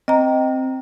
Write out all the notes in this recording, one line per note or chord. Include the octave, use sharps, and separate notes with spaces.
C4 D#5 A#5